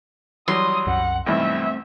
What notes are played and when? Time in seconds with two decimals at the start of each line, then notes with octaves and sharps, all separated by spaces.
0.48 E3 F#3 G3 C6 D#6
0.86 C2 F#2 F#5
1.26 B1 G2 E3 A3 B3 C4 E5